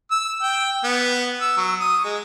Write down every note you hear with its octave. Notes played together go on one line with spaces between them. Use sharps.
E6
G5
B3
E6
F#3
D#6
G#3